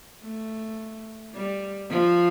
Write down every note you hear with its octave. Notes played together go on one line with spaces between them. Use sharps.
A3
G3
F3